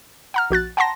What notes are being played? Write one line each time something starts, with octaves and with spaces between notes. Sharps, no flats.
F#5 A#5 F6
A#1 F#4 F#6 A6
F#5 G5 A5 A#5 C6 A#6